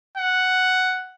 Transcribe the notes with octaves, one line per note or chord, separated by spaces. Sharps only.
F#5